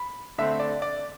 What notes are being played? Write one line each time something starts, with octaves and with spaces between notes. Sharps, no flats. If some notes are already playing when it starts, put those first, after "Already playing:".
Already playing: B5
D3 A3 C4 E5
D5
D5